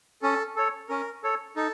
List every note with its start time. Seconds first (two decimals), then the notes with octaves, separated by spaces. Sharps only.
0.22 C#4 A4
0.56 A4 C#5
0.89 C#4 A#4
1.23 A4 C#5
1.56 D#4 A4